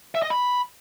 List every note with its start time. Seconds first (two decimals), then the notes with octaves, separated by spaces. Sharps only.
0.15 E5
0.23 D#5
0.30 B5